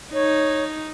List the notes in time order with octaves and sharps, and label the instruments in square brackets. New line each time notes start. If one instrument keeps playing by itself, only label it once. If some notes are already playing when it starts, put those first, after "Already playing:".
[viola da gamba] D#4 [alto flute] C#5